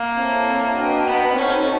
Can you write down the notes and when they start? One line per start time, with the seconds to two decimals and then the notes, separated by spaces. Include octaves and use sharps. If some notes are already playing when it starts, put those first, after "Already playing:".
Already playing: A#3
0.15 C4 E4 A4 C#5
0.76 D4 F#4 B4 D#5 G5
1.07 B3
1.36 C4 C#4 D#4 F#4 A4